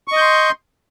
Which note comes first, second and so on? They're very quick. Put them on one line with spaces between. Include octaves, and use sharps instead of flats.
C#6 D#5 G6 C6